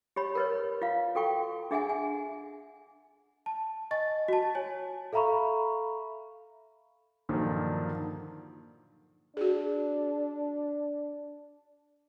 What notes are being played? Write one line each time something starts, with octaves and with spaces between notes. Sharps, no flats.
G4 C#5 B5
A#4 B4 C#5
F4 F5
F#4 A4 G5 C#6
D4 G#4 E5 F#5 G#5
G#5
A5
D#5 G#5 C#6 A6
F#4 A5
C#5 G#5
A4 E5 F5 A#5 B5 C#6
G2 A#2 D3 D#3 F3 F#3
D4 F#4 G#4